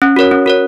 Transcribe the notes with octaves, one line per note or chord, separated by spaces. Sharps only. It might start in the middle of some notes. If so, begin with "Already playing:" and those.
C#4
F#4 A#4 C#5
C#4
F#4 A#4 C#5